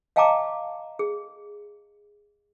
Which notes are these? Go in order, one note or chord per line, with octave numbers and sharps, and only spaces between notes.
D#5 F5 G5 A5 A#5 D6
G#4